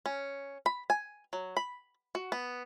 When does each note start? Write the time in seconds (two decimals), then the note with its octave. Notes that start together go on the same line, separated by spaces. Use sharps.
0.06 C#4
0.66 B5
0.90 G#5
1.33 F#3
1.57 B5
2.15 F#4
2.32 B3